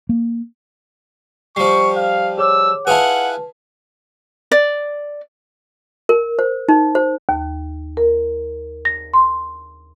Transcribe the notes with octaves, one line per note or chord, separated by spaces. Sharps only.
A#3
F3 G3 C#6 C7
F5
G#4 C#5 D6 E6
E4 F4 G#4 B4 F#5 A5
D5
A#4
C5
D#4
C5
D#2
A#4
A#6
C6